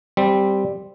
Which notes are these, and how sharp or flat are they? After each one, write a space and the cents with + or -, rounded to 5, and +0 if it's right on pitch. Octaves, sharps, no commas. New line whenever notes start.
G3 +0 C4 +0